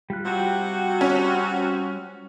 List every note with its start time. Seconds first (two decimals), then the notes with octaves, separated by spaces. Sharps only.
0.10 G3 F4 F#6
0.24 C3 C4 F#4
1.01 C#4